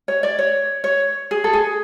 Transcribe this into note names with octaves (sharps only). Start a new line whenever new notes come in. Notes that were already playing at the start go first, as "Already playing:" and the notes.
C#5
D5
C#5
C#5
G#4
A4
G#4